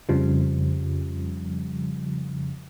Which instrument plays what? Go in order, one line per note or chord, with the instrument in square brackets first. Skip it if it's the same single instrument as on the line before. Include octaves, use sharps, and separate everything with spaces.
[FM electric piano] F2 C#3 F3 G3